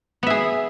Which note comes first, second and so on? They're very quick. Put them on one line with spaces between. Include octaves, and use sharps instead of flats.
B3 E5 G#4